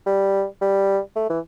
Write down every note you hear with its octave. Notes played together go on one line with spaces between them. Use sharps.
G3
G3
A3
E3